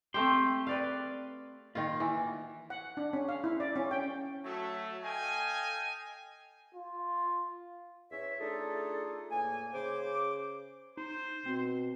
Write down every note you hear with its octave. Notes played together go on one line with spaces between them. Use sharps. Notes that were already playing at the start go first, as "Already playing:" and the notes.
A3 C4 G4 A4 C6
B4 D5 F5
D#3 A#3 F4
E3
F#5
D4
C#4
F5
E4
D5
C#4
G5
F#3 A3
A4 D#5 F5 G5 G#5
F4
E2 C#4 C#5 E5
A3 D4 D#4 F4 G#4 A4
E2 A2 A#3 G#5
C#3 C5 D6
D#4 C5
B2 C4